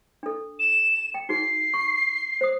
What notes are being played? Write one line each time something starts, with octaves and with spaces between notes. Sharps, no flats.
D4 A4
E7
G5
D#4 F#4 G#4 C7
C#6
C5 D#6